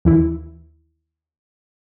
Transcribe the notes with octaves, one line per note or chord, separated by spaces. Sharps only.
D#2 E3 E4